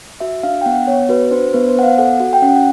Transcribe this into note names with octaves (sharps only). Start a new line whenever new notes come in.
F#4 E5
D4 F5
G5
B3 F#5
B3 C#5
F#4 B4
D4 C5
B3 B4
C5
B3 F#5
F5
A4 F#5
F#4
G5
C#4 F#5
F#5